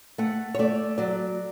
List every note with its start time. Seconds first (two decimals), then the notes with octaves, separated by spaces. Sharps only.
0.18 A3 F#5
0.55 C#5
0.59 A3 D5
0.98 F#3 D5